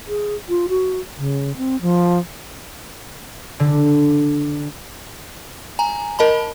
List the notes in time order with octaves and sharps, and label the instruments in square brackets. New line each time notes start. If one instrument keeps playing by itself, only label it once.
[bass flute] G#4
F4
F#4
C#3
C4
F3
[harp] D3
[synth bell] G#5 A#5
A#4 D#5 A5 B5